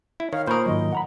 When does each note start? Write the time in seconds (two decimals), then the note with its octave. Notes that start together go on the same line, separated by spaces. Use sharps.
0.20 E4
0.33 D#3 C#5 F5
0.47 A#2 A#4 C5 B5 C#6 D#6
0.66 G#2 D#3 F#3 D#5
0.93 F#5 A#5 B5